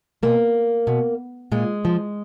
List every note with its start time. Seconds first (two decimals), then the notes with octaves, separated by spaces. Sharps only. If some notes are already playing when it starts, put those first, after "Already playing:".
0.23 B2 A#3
0.87 B2
1.52 A#2 G#3
1.85 F3